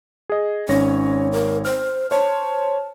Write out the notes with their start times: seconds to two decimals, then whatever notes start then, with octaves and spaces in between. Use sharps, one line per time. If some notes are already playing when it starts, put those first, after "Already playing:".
0.30 G#4 D#5
0.69 G#1 C#4 C#5 A#6
1.32 A#4
1.65 C5 F6
2.11 C5 C#5 A5